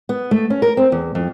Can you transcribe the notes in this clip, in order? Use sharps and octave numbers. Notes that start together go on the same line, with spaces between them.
B3
A3
C#4
A#4
C4
E2
F2